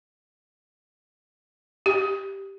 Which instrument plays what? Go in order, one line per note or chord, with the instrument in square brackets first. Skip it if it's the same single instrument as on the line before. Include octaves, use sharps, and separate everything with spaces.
[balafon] G4